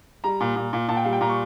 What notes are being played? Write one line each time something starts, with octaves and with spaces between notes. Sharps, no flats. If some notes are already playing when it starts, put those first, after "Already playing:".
G3 A#5
A#2
A#2
A#2
A#2 A5
G5
G3 F5
G5
A#2 A#5
C#6